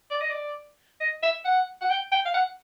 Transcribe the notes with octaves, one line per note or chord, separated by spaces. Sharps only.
D5
D#5
D5
D#5
E5
F#5
F#5
G5
G5
F5
F#5